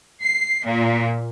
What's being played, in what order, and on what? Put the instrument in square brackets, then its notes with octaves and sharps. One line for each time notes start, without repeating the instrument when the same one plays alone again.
[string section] C7
A#2